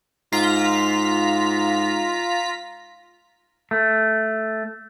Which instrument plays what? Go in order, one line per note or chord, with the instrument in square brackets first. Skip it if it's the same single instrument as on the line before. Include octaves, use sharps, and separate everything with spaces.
[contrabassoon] G#2 [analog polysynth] F4 A#5 B6
[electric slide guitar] A3